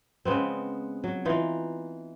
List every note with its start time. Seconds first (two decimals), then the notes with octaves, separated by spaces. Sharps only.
0.25 C#3 G#3 B3 C4
1.04 F#3
1.25 E3 D#4 F4